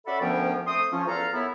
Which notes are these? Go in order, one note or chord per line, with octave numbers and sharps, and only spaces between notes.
C#4 F#4 A4 D5 E5 B5
D2 A#2 F3 B3 C#4 G5
A3 C4 C6 D#6
F3 C#4
E2 F4 A4 F5 A#5
F#2 C#3 B3 E4